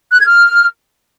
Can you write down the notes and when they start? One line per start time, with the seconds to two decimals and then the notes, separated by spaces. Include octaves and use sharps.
0.12 F#6
0.20 G#6
0.28 F6